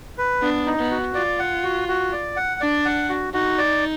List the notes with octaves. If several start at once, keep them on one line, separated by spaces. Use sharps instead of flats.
B4
B3 D4
D#4
B3
F#4
F4 D5
F#5
F#4
F#4
D5
F#5
D4 D5
F#5
F#4
D#4 F#4
D5